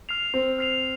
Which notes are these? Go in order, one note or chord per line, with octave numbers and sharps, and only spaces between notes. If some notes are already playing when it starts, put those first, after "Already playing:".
F6 C7 F7
C4
F6 C7 F7